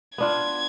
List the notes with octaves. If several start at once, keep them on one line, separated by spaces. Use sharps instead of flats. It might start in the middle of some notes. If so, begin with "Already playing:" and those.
B3 D4 F4 G#6